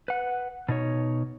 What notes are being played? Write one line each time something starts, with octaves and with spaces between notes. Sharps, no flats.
B4 F#5
B2 D#4 C#5